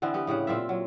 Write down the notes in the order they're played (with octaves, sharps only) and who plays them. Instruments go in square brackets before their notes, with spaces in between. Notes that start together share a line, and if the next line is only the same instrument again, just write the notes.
[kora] D3 E3 B3 C4
B3 G4
A2 C#3 G4 F#5
A#2 C4 F4 E5
F#3